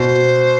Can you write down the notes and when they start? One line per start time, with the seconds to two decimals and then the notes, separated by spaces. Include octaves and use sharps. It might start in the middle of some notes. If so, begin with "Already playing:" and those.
Already playing: B2 C5